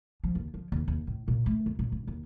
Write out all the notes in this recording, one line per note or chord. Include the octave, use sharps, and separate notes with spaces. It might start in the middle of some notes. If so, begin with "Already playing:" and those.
F3
D#2
F3
D#2
D#2
A2
A#2
A3
E2
A#2
D1
D#2